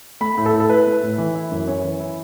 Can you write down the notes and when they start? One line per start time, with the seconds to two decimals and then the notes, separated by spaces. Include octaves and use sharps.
0.21 A3 B5
0.38 A2
0.46 A4
0.53 A2
0.60 A4
0.69 E4 B4
0.87 A3
1.03 A2
1.18 E3
1.35 E4
1.52 F#2
1.68 C#4 C#5
1.84 E3
2.00 E4